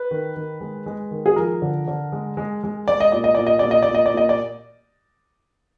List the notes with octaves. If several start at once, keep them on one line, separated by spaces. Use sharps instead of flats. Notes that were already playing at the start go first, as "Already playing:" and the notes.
Already playing: B4
D#3
D#3
G#3
G#3
D#3
G#4
F3 A#4
D3
D3
G#3
G#3
G#3
G#3 D5
D#5
A#2 D5
D#5
A#2 D5
D#5
A#2 D5
D#5
D5
A#2
D#5
D5
A#2 D#5
D5